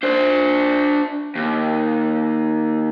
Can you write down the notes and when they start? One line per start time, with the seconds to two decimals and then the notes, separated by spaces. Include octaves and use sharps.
0.03 D4 C5
1.35 D#2